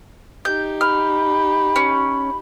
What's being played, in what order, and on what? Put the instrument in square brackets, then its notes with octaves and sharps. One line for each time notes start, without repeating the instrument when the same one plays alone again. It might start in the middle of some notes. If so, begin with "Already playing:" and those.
[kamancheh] D#4 G4 [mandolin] G6
[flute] B5 [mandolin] F6
[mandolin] C#4